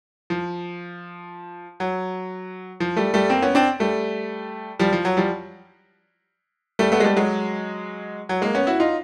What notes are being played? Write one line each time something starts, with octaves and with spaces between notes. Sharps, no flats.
F3
F#3
F3
G3 A3
G3 A3
A#3 C4
B3 C#4
C4 D4
G3 A3
F3 G3
F3
F#3
F3 G3
G3 A3
A3 B3
G#3
G3 A3
F#3 G#3
F#3
G#3 A#3
B3 C#4
E4 F#4
D#4 F4